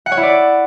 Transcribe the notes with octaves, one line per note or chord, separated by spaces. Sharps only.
F#5
C#5
E4
D5